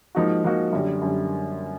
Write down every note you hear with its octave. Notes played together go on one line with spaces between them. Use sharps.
G#2 F3 A#3 D#4 F#4
G#2 F3 A#3 D#4 F#4
F#2 D3 G3
F#2 D3 G3